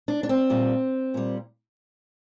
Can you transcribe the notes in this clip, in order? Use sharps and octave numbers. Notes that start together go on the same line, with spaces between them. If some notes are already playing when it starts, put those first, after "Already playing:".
D4
D4
C4
A#2 G3
A#2 G3